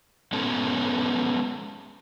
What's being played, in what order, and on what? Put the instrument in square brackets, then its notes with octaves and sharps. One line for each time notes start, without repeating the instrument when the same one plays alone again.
[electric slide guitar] G#3 B3 C#4 A4 B4